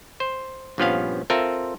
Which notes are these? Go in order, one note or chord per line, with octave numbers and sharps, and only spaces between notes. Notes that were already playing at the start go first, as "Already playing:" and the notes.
C5
A#1 G2 F3 B3 C#4 F5
C4 F4 A4 A#4 E5